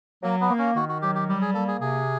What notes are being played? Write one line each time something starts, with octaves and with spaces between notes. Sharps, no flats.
F#3 A#3
B3
A#3
C#4
D#3 F#4
F#4
F#3 G4
G4
G3 G4
G#4
A#3 A4
G#4
C3 G#4